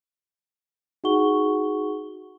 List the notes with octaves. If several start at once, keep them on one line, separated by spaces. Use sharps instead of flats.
D#4 F#4 G#4 F#5 C#6 G7